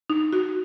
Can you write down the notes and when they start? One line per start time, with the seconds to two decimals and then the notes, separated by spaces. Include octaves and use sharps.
0.10 D#4
0.33 F#4